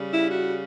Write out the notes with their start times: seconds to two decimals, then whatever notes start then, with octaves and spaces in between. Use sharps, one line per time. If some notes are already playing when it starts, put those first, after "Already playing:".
Already playing: C#3 G3
0.12 E4
0.30 F#4